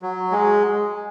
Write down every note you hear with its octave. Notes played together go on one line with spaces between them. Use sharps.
F#3
G#3